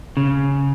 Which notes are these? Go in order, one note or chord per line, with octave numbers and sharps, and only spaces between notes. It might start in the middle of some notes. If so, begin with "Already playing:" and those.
C#3